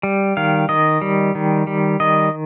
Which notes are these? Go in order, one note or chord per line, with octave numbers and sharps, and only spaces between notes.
G3
D#3 F5
D#3 D#5
G3
D#3
G3
D#3 D#5